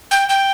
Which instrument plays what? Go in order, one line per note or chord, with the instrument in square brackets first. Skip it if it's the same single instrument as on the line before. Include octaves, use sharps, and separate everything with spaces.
[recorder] G5
G5